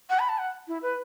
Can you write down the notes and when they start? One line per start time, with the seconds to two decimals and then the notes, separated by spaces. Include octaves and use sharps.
0.10 F#5
0.19 B5
0.29 A5
0.38 F#5
0.68 E4
0.82 B4